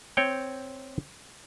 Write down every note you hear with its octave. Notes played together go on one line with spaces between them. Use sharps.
C4 C#5 G5